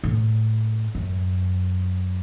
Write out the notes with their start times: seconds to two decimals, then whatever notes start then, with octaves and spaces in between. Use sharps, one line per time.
0.04 A2
0.95 F#2